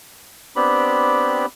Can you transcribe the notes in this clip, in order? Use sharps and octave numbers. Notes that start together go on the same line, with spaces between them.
B3 C4 D4 G4 B5